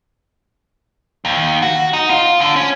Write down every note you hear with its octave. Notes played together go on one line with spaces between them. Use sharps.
D#2
F#4
D#4
F4
D3
C#4